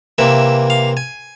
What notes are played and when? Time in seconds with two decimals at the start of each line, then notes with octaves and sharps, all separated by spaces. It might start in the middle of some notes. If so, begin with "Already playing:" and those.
0.18 C3 E3 A#3 E5
0.70 F5
0.97 G#5